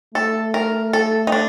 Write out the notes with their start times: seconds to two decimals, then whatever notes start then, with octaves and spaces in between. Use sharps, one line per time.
0.15 A3 A4
0.54 A#4
0.93 A4
1.27 D#4
1.32 D4